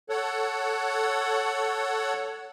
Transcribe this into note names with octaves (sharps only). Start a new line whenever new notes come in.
A4 C#5 F#5